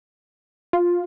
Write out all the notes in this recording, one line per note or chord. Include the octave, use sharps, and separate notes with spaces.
F4